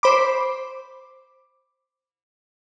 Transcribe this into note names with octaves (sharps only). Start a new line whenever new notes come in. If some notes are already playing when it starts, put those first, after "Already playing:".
C5 B5 D6